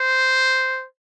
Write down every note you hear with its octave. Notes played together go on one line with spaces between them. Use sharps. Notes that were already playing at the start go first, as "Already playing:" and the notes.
Already playing: C5